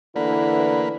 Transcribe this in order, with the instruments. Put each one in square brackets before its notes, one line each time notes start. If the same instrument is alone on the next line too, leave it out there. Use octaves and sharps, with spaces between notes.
[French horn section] D2 E3 E4 [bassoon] D3 [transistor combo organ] A#3 B4